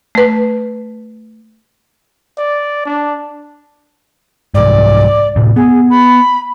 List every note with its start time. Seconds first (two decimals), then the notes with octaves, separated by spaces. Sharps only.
0.15 A3 B4
2.38 D5
2.85 D4
4.54 C2 G#2 D5
5.36 D2 A2 C3
5.56 B3 G#4
5.90 B5